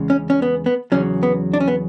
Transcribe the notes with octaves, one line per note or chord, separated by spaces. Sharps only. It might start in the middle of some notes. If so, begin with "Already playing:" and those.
Already playing: E2 C#3 G#3
C#4
C#4
B3
B3
E2 C#3 F#3 C#4
B3
D4
C#4
B3